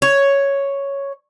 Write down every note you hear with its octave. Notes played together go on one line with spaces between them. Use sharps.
C#5